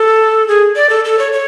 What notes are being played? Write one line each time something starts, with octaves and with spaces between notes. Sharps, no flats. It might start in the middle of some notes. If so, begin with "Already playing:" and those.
Already playing: A4
G#4
D5
A4
A4
C#5
C#5